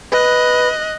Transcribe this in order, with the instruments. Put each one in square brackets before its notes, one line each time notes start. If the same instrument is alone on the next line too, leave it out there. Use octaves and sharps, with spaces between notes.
[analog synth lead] B4 [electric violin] D#5 F#6